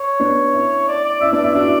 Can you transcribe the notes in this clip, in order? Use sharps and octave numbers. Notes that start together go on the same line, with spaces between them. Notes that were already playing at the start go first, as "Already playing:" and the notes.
Already playing: C#5
B3 D4
C#4 E4
D5
D5
C#4 E4 E5
B3 D4 D5
C#4 E4 E5
D4 F#4 D5